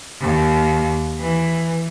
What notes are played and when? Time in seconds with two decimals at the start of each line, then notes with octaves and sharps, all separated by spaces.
0.20 D#2
1.19 E3